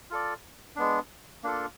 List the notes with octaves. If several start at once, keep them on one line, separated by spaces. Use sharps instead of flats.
F4 A4 D5
G#3 B3 D4
A#3 D4 F4 A4